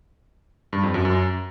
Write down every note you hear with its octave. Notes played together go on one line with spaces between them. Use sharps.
G2
F2
F#2
F#2